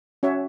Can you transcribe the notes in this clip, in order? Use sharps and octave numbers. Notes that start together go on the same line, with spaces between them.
C#4 F#4 C#5 E5